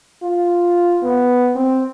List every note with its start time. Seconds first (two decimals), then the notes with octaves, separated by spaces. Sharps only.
0.23 F4
1.03 B3
1.55 C4